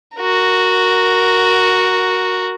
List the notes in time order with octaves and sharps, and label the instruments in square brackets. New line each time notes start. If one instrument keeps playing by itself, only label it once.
[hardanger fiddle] F#4 A#4